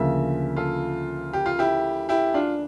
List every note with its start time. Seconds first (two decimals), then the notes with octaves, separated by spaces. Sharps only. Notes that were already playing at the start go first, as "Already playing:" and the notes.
Already playing: D2 C#3 F3 A#3 E5
0.57 F4 A4
1.33 G4
1.46 F4
1.59 E4 G4
2.09 E4 G4
2.34 D4 F4